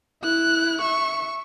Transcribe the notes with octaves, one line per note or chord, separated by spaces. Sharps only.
E4 F#6
E5 C#6